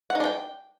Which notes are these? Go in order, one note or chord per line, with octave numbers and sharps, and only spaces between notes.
F#5
D#4
D4
G5